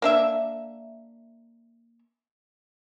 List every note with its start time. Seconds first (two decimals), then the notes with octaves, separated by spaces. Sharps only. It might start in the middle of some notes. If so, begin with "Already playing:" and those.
0.02 A#3 D4 E5